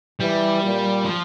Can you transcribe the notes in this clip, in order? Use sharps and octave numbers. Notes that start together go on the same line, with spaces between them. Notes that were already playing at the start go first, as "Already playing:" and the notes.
E3 G3
A#2
F3